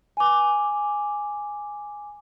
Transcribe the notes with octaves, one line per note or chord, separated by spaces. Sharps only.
G#5 D6